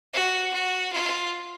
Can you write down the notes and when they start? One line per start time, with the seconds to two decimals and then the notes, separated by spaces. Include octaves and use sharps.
0.14 F#4
0.53 F#4
0.92 F4